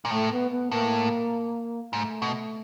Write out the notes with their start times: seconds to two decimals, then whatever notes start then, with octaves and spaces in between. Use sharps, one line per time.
0.05 A#2
0.10 A2 A3
0.32 B3
0.51 B3
0.71 A2 A#3
1.93 G#2 A3
2.22 B2